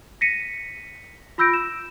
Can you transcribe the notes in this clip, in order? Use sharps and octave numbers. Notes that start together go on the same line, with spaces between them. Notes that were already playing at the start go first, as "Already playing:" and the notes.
A#6 B6 C#7 D#7
F4 B5 E6 G6 A#6 D7
E7